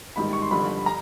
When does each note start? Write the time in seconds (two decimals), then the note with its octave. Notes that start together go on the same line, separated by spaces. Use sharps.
0.16 A1 G#2 D#3 G3 B5
0.33 C#6
0.42 C6
0.51 G1 G2 D3 F3 B5
0.86 A#5